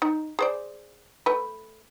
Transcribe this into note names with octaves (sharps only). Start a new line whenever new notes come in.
D#4
G#4 C5 D5
A3 B4